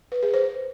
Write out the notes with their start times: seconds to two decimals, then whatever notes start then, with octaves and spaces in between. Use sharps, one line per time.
0.12 B4
0.23 G#4
0.34 C5